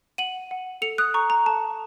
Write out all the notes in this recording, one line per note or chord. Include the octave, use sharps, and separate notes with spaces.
F#5 D#7 F#7
F#5
A4 C#7 F7
D#6 F#6
A4 A#5 C#6
A#5
A4 A5